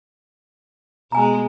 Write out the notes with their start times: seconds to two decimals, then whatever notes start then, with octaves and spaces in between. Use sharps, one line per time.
1.12 B2 G#3 G#5 A#5